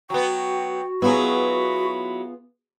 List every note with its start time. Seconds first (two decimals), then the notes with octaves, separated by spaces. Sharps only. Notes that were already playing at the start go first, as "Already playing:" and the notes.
0.10 F#3 B3 F#4 G5
1.02 F#3 B3 E4 F4 G#4 B5